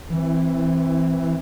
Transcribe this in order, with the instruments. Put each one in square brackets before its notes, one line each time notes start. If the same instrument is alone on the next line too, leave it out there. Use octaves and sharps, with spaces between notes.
[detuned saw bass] E3 [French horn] C4